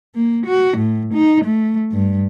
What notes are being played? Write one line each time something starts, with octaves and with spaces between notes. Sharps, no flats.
A#3
F#4
A2
D#4
A3
G2